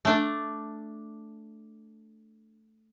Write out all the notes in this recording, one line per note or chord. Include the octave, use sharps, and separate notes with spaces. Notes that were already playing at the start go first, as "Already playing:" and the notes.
A3 D4